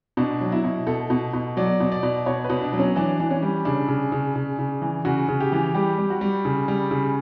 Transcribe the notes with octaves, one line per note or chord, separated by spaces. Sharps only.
B2 D4
F#3
E4
B2
B2 A4
B2
B2
F#3 D5
B2
D5
B2
B2 C#5
B4
B2
D4
F#3
C#4
E3 D4
E3 D4
C#4
G3
C#3 D4
C#3
C#3
C#3
C#3
E3
C#3 F#4
C#3
G4
E3
G3 G4
G3
F#4
G3
C#3
G3
C#3